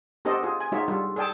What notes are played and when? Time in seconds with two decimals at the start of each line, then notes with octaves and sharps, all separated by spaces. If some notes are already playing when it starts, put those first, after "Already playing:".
0.25 B3 D4 G4 A4 C5 D#5
0.43 F4 G#4
0.60 G#5
0.72 G#3 D#4 F4 F#4 C#5 E5
0.88 G3 D4 F4 A4
1.16 G#4 A4 D5 G5 A5